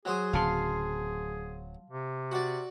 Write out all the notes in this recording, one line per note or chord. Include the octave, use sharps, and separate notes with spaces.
F#3 F#4 G#4 C5 D#6
D1 C#3 F5 A5 C6
C3
F#4 D5